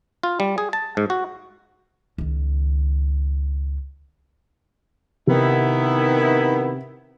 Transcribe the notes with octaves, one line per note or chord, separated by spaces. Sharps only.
F4
G3
G#4
A5
G#2
F#4
C#2 D#3
C3 D#3 B3 E4